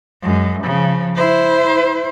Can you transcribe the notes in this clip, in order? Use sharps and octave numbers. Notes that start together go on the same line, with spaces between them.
F#2 G#3
C#3 F3
E4 C5